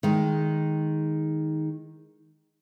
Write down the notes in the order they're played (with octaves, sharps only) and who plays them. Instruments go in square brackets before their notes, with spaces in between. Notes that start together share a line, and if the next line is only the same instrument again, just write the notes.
[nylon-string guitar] D#3 G#3